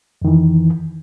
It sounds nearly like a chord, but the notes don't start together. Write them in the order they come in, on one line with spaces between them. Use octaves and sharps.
F2 D#3 E3